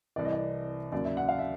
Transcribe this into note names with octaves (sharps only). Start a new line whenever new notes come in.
C2 C3 E3 D5
D#5
D5
D#2 C#3 F#3 D5
E5
F#5
F5
E5